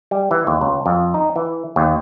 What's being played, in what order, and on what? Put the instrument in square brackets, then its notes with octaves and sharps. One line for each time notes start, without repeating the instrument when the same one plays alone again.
[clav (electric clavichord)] G3
E3
D#2
C#2
F2
D#4
E3
D#2